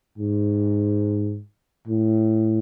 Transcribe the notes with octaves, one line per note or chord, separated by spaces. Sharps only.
G#2
A2